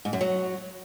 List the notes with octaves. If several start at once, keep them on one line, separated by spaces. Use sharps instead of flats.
G#2
F#2
F#3